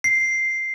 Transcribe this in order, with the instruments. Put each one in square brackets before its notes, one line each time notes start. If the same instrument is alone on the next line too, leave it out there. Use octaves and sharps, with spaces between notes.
[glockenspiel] C7